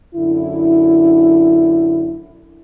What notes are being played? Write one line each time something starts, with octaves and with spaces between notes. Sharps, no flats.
F#2 D3 E4